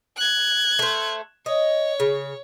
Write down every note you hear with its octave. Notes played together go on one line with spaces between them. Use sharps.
F#6 G#6
A3 C5
C#5 D#5
C#3